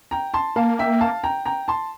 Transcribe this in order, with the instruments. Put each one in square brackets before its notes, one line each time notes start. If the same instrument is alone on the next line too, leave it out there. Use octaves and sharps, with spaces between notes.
[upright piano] G5 A#5
A5 C6
[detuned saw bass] A#3 [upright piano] F5 A5
[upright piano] E5 G5
F5 A5
G5 A#5
G5 A#5
A5 C6